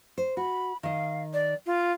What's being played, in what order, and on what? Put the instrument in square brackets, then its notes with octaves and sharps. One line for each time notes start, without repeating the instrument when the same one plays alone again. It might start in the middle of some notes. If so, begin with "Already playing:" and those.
[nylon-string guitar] C5
[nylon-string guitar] F#4 [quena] B5
[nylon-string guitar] D#3 D#5 [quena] F5
[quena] D5
F4